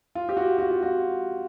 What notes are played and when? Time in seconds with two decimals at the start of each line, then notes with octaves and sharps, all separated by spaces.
0.15 F4
0.29 G4
0.37 F#4
0.58 F#4
0.71 F4
0.83 F#4